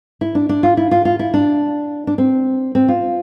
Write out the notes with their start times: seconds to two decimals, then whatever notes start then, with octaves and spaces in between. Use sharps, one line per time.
0.21 E4
0.35 D4
0.49 D4
0.63 F4
0.77 E4
0.91 F4
1.05 F4
1.19 E4
1.34 D4
2.07 D4
2.18 C4
2.75 C4
2.88 F4